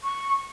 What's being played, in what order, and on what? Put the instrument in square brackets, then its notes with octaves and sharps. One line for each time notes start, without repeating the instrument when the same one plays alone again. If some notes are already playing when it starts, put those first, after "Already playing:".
[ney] C#6